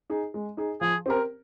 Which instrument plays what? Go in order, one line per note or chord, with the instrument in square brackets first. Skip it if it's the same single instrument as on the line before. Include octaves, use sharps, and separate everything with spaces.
[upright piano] D#4 G#4
G#3
D#4 G#4
[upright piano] F3 [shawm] G#4
[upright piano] C4 G4 A#4